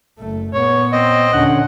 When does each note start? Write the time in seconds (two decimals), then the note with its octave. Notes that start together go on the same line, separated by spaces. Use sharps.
0.19 F#1 A3
0.54 A#2 B3 C#5
0.92 C4 D#5
1.33 D#2 A#2 D3 C#4 F#5